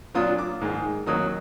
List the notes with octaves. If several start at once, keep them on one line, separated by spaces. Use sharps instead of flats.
A#2 F#3 D4 F4 D#6
D6
G#2 D#3 G#3
D#2 D#3 F#3 A#3 D#4 D#6